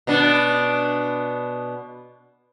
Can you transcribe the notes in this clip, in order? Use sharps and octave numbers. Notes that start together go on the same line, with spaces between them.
B2 B3 D4